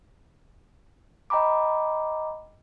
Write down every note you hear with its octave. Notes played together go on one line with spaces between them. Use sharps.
D#5 G5 A#5 B5 D6